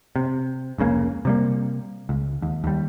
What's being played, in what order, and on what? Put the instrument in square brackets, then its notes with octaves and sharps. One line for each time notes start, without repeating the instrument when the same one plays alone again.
[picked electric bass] C3
F1 C#2 C#3 A#3
C3 G3 A#3
C#2
D#2
D#2 G3